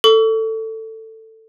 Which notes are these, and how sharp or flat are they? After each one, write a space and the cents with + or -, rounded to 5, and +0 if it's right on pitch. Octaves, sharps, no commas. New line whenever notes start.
A4 +15 C#6 +40